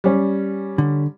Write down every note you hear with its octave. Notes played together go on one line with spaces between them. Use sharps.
G3 C#4
D3